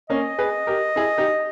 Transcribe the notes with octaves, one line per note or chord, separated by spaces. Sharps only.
A#3 C#4 D#5
G#4 B4
G4 A#4
E4 G#4
D#4 G4